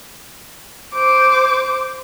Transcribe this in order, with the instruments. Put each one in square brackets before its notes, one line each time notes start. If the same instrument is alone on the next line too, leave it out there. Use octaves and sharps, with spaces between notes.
[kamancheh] C5 D6